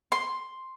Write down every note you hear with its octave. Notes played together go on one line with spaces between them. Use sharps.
C6